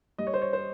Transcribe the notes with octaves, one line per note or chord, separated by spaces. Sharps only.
G3 D#5
C#5
C5
C#5
C5